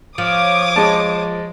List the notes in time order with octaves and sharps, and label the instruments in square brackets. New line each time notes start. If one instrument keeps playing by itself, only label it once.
[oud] F3 [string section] C#5 D6 D#6
[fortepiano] G#3 A5